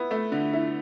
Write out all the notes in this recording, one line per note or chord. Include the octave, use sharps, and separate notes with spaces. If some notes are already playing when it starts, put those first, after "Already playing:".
Already playing: B3 E4
A3
D3
E4